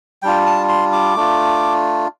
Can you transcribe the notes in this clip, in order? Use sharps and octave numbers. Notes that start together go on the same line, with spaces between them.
G3 D4 F4 G5
A5
C6
D6
A3 D4 F4